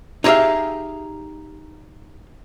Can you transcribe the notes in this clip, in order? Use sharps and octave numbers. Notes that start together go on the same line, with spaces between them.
D#4 E4 G4 G#4 E5 F5